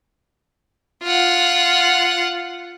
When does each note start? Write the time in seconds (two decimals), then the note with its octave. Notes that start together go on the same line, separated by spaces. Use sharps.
1.03 F4 F#5